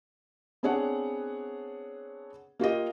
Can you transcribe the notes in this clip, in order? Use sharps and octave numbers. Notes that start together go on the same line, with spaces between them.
B3 C4 D4 G#4 C#5 F#5
A#3 F4 G4 D#5